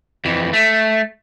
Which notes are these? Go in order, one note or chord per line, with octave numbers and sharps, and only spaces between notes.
F2 E3
A3